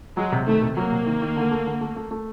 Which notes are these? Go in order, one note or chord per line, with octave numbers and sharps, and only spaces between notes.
F#3 G#3
C3
D#3 A3
C3
F#3 A#3
C3
D#3
D#3
D3
A3
D3
A3
A3
A3